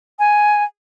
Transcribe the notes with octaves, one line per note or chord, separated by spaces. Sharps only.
G#5